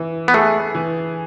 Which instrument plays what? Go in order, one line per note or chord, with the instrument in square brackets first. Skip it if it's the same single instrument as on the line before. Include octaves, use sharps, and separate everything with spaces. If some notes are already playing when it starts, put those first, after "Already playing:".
Already playing: [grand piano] E3
[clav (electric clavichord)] B3
[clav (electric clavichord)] A3 [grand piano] G#4
[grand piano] E3